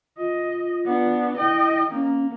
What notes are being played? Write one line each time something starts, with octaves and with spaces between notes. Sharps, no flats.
F4 D#5
B3 D4
E4 D#5 G5
A#3 C#4